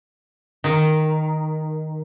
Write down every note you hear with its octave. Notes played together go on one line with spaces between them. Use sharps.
D#3